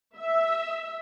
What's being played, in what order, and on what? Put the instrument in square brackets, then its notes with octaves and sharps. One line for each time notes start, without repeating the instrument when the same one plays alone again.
[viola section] E5